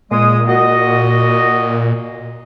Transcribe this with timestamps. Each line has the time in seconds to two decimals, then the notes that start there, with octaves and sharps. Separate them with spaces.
0.11 A#2 G#3 D#6
0.48 F#4 D#5